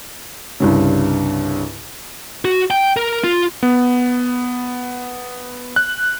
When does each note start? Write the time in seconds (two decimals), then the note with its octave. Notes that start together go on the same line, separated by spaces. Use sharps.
0.60 C2 G2 C#3
2.45 F#4
2.70 G5
2.97 A#4
3.24 F4
3.63 B3
5.76 F#6